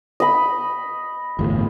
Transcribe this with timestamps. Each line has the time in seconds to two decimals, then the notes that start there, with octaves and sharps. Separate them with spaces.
0.20 D#5 B5
1.39 G1 E2 A2